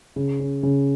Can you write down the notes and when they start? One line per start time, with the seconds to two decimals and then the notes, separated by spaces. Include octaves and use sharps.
0.16 C#3
0.40 C#4
0.63 C#3